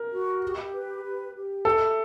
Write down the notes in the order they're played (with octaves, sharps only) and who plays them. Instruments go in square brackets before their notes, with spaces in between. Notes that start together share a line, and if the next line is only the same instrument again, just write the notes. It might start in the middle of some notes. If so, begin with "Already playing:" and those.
Already playing: [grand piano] A#4
[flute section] F#4
G4
B4
G4
G4
[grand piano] A4 [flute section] E5